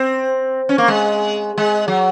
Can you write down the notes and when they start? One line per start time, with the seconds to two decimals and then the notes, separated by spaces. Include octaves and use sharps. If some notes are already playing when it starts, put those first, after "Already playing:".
Already playing: C4
0.69 C#4
0.78 A#3
0.88 G#3
1.58 G#3
1.88 F#3